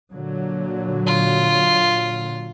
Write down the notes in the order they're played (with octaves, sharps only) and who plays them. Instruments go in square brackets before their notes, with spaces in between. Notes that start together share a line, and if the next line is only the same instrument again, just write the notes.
[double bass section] A#2 D3 F#3
[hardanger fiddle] F4